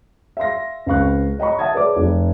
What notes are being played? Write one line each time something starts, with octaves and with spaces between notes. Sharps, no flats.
E5 F5 C6 A#6
C#2 C4 F5 C#6 F#6
C#5 D#5 G5 A#5 B5 C#6
E5 F#5 A5 D#6 G#6
G#4 B4 C#5 D5 D6
F1